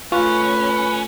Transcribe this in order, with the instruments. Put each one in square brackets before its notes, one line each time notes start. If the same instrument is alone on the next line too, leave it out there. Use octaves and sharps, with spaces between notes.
[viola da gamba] A3 [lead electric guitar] C#4 [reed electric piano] F4 C#6 [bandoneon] B4